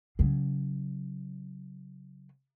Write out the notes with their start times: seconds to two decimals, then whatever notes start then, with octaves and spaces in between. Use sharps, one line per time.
0.19 C#3 F#3